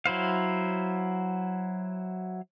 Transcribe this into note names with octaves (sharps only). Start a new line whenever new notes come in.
F#3 E4 C5 F5